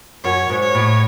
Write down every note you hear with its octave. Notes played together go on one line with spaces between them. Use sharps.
F#2 C#5
G#2
C#5
A2